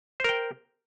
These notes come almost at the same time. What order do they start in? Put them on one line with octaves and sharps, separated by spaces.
C5 A#4 G5